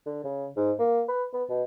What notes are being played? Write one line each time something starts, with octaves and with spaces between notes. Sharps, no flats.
D3
C#3
G#2
A#3
B4
B3
B2